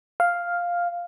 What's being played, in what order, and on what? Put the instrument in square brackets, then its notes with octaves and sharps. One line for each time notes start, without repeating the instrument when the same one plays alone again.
[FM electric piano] F5